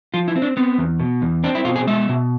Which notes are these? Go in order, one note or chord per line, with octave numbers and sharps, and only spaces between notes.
F3 F4
E4
C4
D4
B3 C4
E2
B2
E2
C4 D4
E4
B2 F4
G#4
G#3 E5
B2